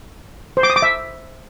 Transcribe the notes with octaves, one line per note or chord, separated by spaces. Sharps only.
C5
D6
D#6
D6
E5